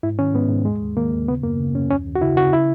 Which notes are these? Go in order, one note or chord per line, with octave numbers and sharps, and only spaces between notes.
G#2 E4
D#3 C#4
G#2 B3
G#2
D#2 G#3
D#2
D#3 A#3
D#2
C#3 B3
F#2 A#3
C#3
F#2 C#4
D#2 C#4
D#2
F#4
C#3 E4
C#3 F#4
E4